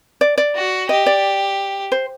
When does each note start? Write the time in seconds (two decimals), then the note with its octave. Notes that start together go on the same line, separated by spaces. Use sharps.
0.21 D5
0.38 D5
0.55 F#4
0.89 G4 D#5
1.06 D5
1.92 C5